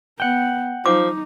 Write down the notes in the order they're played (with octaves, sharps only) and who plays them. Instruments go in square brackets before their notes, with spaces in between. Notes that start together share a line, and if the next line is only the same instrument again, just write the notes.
[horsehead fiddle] B3 [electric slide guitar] F#5 G5
[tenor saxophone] F3 [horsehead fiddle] D#4 [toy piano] D6